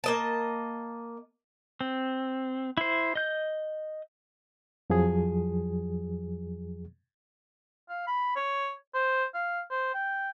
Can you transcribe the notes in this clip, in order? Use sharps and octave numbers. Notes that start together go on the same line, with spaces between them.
A#3 D#5 A5
C4
E4 C5
D#5 G6
F2 F3 F#3 G#4
F5
B5
C#5
C5
F5
C5
G5